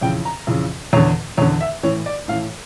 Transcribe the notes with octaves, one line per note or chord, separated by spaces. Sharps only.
F2 C#3 E3 G5
A#5
F2 C#3 E3
E2 D3 C#5
E2 D3 C#5
E5
A2 E3 C#5
D5
A2 E3 F5